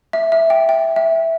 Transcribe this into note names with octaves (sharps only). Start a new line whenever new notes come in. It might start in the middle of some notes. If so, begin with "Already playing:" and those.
E5
E5
G5
G5
E5